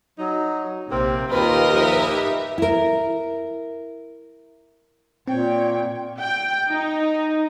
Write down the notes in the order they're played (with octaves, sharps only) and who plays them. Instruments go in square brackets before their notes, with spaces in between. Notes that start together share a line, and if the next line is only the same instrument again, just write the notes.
[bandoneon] F#3 [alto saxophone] D#4
[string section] A#1 C3 [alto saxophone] A#3 [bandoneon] C4
[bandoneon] D#2 [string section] F4 G4 [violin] A#4 D#5 [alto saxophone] B4
[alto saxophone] F3 [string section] D#4 B4 E5
[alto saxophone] G4
[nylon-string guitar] E4 A#4
[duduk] A#2 [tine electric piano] C4 [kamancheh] C#5 G5
[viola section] G5
D#4